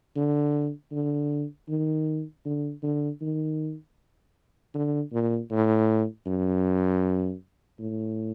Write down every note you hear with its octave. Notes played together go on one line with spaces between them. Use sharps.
D3
D3
D#3
D3
D3
D#3
D3
A#2
A2
F#2
A2